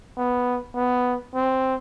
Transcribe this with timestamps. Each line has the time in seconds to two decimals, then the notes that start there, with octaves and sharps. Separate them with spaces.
0.17 B3
0.75 B3
1.35 C4